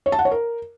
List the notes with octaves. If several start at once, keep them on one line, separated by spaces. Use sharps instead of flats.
C#5
A5
F#5
C#5
A#4